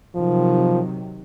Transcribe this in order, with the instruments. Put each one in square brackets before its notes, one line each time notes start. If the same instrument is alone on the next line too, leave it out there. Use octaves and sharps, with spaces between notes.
[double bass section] C3 D#3 F#3 [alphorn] F3